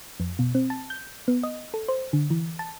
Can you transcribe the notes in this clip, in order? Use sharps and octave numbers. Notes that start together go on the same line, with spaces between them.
F2
B2
C4
A5
G6
B3
D#5
A4
C5
D3
E3
A5